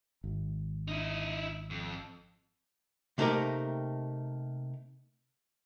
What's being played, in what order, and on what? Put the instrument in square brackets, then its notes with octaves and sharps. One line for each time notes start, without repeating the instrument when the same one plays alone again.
[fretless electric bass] G#1
[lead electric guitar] D#4 E4
F2
[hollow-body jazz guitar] C3 A3 A#3 D#4 G4 A#4